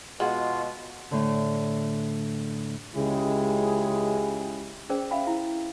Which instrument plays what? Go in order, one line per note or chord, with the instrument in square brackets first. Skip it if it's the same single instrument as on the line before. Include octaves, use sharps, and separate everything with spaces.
[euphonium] B2 [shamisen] G#3 F#4 [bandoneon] F4
[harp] A2 D3
[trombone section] C#2 C#3 G#3 E4 G4 G#4
[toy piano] C#4 G#4 A#4 C5 D5 G5
E5 F5 G5 B5
E4 F5